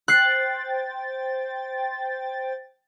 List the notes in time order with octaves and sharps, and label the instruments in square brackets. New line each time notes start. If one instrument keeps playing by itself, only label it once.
[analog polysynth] C5 G5 A6 [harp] F#6 C7